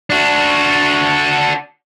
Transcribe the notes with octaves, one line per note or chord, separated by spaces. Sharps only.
D4 F#4